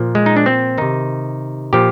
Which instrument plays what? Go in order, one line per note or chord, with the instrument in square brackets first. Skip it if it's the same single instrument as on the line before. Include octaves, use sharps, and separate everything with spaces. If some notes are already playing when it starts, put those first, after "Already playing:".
Already playing: [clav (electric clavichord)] A#2 F3
G#3
D#4
D4
C4
C3 D#3 D#4
A#2 F3 G4